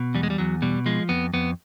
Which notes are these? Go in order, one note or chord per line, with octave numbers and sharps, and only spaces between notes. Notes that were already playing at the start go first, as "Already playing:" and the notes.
Already playing: B2
E2 G3
G#3
G3
E2 F#3
B2 G3
F3 G#3
F2 B3
F2 B3